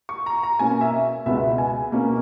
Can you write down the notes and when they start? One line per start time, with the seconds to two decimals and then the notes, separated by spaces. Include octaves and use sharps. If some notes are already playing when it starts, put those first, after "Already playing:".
0.09 C#6
0.26 A#5
0.43 A#5
0.59 B2 A#3 C#4 G#5
0.81 E5
1.26 C#2 B2 G#3 B3 E5
1.58 G#5
1.92 B2 A#3 C#4